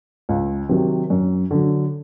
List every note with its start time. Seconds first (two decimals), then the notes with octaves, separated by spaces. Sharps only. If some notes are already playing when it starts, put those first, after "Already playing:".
0.29 C#2
0.69 C3 D#3 F#3
1.10 F#2
1.51 D3 F#3